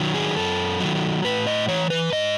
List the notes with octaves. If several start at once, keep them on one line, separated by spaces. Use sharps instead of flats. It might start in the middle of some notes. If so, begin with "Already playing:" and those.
Already playing: D#3 F#3
G#4
F#2 A4
D#3 F#3
A2 B4
D#5
E3 C#5
B4
G#2 D#5